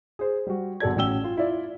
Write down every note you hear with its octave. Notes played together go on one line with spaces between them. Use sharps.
G#4 C5
G3 F#4
G1 F#3 A4 D5 G#6
A1 C#4 F#4 G5 E6 G7
F4
E4 F4 D5